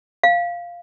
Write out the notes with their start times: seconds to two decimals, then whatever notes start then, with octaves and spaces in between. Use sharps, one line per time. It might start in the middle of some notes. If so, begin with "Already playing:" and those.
0.23 F5